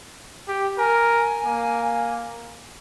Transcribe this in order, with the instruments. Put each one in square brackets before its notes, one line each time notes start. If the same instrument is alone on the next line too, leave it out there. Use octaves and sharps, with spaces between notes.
[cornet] G4
[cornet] A#4 [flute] G#5
[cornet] A#3